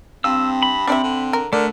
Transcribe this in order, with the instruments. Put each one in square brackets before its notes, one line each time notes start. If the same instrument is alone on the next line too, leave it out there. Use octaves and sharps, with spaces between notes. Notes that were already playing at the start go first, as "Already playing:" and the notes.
[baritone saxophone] G2 [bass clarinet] C4 [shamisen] F4 [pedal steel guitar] E6
[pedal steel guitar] B5
[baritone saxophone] C3 [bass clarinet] C4 [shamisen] D4 D5 E5
[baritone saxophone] D3
[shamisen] A#4
[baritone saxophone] D3 [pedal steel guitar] A3 [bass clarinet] A#4 [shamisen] D5